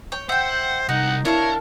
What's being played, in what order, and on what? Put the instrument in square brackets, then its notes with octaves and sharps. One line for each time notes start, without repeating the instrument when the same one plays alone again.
[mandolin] C#5 G5
[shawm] C5 [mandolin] E5 G5 [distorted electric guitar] F#5
[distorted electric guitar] C2 [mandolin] D#4 [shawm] F#5
[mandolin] D4 A4 F5 [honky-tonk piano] E4 [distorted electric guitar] A#4 [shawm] C#5